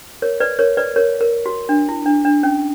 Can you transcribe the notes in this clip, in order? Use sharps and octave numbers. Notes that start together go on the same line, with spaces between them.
A#4 C#5
B4 D5
A#4 C#5
B4 D5
A#4 C#5
A#4
F#4
D4
E4
D4
D4
C#4